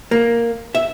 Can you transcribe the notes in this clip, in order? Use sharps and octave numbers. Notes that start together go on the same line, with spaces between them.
A#3
E5